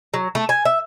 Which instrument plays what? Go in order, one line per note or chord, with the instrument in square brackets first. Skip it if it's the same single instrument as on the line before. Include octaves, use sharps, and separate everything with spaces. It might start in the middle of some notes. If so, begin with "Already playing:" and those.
[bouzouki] F#3
A3
G#5
E5